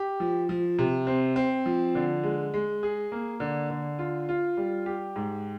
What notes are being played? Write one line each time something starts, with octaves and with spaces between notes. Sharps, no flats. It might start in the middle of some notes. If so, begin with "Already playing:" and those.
Already playing: G4
F3
F3
C3
C4
C4
F3
D3
G#3
G#3
G#4
A#3
D3
D3
F4
F4
G3
G4
G#2